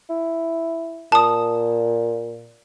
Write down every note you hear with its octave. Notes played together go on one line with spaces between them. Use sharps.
E4
A#2 A5 D#6